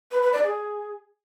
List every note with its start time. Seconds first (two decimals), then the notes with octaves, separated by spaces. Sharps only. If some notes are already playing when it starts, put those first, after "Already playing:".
0.11 B4
0.22 B4
0.33 D5
0.43 G#4